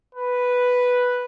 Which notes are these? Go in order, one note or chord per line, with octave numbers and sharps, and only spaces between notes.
B4